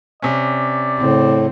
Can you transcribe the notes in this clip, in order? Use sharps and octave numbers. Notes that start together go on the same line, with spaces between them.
C3 C#4 D5
A2 C#3 C4